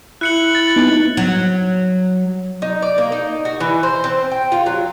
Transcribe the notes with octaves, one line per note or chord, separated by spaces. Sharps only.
E4 F#6 C#7 F#7
A6
B3 D#4
F#3
D#4
D5
A#3
D#4
F#4
E3
C5
C4
G5
F4
F#3